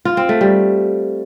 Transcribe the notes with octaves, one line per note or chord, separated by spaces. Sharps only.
F4
C4
A3
G3